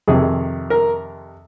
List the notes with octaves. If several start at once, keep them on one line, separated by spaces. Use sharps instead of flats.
F2 C3 D#3 G#4
A#4